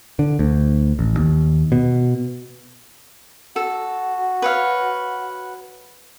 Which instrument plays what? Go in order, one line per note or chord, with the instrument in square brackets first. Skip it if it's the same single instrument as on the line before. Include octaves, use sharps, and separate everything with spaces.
[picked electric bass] D3
D2
A1
D#2
B2
[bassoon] F#4 [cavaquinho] A4
[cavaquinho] B4 C#5 F5